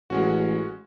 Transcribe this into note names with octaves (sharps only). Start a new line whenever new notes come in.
A1 G#3 C#4 F#4